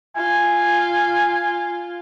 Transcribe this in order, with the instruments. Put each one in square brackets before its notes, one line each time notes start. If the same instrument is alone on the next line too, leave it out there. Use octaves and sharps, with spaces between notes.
[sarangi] F4 [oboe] G#5